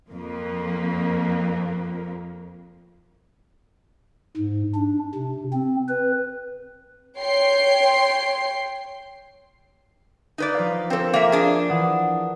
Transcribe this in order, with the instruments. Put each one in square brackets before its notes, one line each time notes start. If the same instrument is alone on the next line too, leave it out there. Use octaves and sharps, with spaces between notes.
[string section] F2 A#3
[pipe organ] G#2
D4
C3
C4
B4
[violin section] C#5 G5 C6 C7
[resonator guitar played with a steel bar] D#4 B4 D5
[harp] F3 F5
[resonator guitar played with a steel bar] C4 A4 [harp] A#4 C5
[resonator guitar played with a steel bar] A#3 E5
D4 G#4
[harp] E3 F#5 D#6